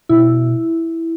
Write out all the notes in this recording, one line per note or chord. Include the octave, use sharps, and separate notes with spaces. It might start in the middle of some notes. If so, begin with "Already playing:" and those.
B2 E4